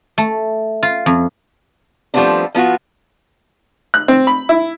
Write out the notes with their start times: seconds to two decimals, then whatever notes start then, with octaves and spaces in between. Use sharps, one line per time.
0.18 A3
0.83 F4
1.06 F2
2.14 F3 G3 A3 B3 C4 D4
2.55 F3 B3 F4 F#4
3.94 F#6
4.08 C4
4.27 B5
4.49 E4